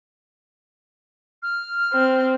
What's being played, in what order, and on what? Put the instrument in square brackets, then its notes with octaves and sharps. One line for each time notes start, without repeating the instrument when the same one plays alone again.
[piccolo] F6
[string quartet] C4